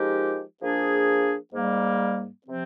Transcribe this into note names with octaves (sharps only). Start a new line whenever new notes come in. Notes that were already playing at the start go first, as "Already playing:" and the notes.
Already playing: F3 G#3 D#4 G4 A#4
F3 A#3 D4 G#4
G#2 G3 A#3
C3 F3 C4